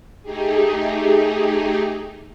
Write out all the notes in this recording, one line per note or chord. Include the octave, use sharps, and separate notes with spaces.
A3 D#4 G4 G#4